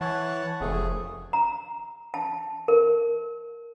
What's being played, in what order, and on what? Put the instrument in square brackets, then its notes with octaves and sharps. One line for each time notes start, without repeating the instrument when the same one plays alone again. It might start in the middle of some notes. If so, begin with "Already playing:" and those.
[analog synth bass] E3 [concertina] C#5 F#5 A5
[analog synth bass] F1 [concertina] A3 G#4
[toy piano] A#5
A5
A#4